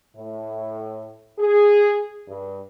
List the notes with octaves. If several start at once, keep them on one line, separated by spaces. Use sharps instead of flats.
A2
G#4
G2